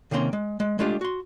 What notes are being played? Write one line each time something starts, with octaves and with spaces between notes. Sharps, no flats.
C3 D#3 A#3 C4 C#4 C6
G#3
G#3
G#3 A3 D4 F4 G4
F#4 C6